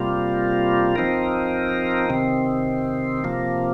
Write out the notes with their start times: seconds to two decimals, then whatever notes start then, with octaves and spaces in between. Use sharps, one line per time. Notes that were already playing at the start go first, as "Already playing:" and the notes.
Already playing: C3 G3 A#3 F4
0.96 F3 C4 D#4 A#4
2.10 C3 D#3 C4
3.24 C3 F3 A#3